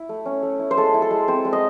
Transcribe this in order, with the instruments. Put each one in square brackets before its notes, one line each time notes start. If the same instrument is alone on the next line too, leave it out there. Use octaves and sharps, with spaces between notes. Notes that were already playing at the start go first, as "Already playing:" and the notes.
Already playing: [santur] E4
A3
C#4
A3
E4
C5
G#3 A4
E4
A4
G#3
C4 C5
G#3
D#5